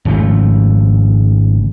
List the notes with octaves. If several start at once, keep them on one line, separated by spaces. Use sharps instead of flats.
G#1 C#3 F3 A3